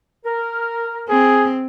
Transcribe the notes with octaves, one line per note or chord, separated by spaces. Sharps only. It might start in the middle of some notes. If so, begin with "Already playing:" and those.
A#4
C4 G#4